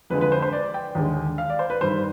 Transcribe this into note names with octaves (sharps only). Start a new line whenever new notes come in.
F2 D3 F3 G#3 B4
B4
C5
C5
D5
G5
D#2 D3 G#3
F5
D5
C5
B4
G2 D#3 G3 C5